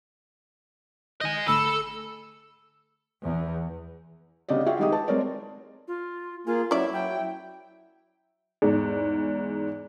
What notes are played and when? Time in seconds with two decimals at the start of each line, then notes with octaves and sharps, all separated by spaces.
1.21 D#3 D#5 G#5 G6
1.48 G#1 D3 A3 A4 B5 E6
3.24 E2
4.49 D2 C#3 G4 D5 D#5
4.66 F4 F#4 G#4 E5 F#5 G5
4.79 D#3 G#3 D#4 G4 G#4 D#6
4.92 B4 A5
5.08 G#3 C4 A#4 C#5 D5
5.88 F4
6.47 A#3 F4 G#4
6.71 F#3 C#4 E4 D5 E5
6.93 F#3 G5
8.62 E2 G#2